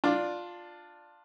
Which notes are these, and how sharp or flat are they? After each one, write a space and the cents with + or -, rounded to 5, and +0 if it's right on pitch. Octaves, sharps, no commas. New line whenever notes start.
D4 +10 F4 +10 D5 +0